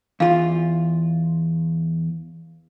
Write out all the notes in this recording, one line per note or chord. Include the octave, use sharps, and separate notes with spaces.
E2 F4 F5